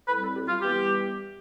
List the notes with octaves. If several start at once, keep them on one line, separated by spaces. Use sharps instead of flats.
A2 G3 C4 B4
A4
G4
F4
E3 G3 B3 G4